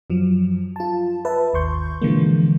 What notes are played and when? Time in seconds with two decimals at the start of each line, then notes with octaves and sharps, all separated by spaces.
0.10 F#2 F3 F#3
0.76 F4 A5
1.25 B4 E5 A5
1.53 G#1 D#2 C6 C#6 G6
2.02 B2 D3 E3 F3 G#3 A#3